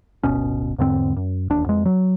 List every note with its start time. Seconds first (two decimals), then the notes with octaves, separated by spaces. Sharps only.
0.23 D1 G1 B2 C#4
0.78 E2 G#2 D3 C4
1.17 F#2
1.50 E1 D#2 D4
1.66 F2 G#3
1.86 F#3